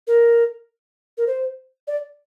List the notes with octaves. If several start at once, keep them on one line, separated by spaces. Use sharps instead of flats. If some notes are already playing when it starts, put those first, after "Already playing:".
A#4
A#4
C5
D5